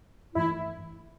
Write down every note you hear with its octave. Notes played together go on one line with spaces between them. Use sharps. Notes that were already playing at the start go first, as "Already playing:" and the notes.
G2 E3 A3 E4